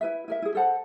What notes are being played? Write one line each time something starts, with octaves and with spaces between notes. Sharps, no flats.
E4 B4 E5
E4 A#4 E5
E4 G#4
A4 C5 F#5 A5